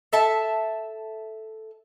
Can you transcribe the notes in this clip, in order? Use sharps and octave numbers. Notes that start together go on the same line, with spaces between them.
A4 E5 A5